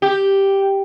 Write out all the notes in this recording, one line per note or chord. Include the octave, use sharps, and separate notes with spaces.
G4